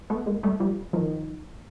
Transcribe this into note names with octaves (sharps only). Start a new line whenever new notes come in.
A3 B3
G#3 A#3
G3 A3
F3 G3
D#3 F3